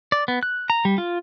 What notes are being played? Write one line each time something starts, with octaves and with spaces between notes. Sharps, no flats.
D5
B3
F#6
A#5
G3
F4